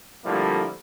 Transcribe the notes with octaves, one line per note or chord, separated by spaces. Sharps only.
D3 F3 G3 A3 A#3 E4